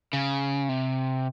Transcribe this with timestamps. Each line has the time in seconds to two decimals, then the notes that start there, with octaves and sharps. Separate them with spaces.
0.13 C#3
0.69 C3